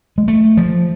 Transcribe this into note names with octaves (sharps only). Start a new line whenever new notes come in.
G#3
A3
F3